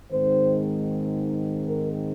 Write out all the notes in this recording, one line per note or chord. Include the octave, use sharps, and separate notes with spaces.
G#2 D#3 G#3 C4 C5
A#4